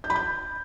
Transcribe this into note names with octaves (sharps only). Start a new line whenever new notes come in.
G6
B5
G6